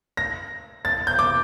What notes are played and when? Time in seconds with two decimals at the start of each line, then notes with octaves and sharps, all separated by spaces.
0.17 A#6
0.85 A6
1.07 G6
1.19 D6